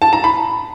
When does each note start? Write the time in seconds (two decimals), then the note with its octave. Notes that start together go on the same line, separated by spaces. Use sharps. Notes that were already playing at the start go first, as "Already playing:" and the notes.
0.02 A5
0.13 A#5
0.24 B5